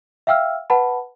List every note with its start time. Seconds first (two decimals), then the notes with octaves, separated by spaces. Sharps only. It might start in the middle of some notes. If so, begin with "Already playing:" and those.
0.27 E5 F5 G5 E6 F6
0.70 B4 F#5 A5 B5